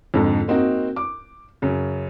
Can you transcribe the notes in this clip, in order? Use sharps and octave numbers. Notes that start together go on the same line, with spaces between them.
F2 G#2 D3
A#3 C4 D#4 F#4
D6
F#2 C#3